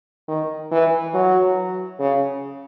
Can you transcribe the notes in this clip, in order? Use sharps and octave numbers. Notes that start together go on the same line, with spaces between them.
D#3
E3
F#3
C#3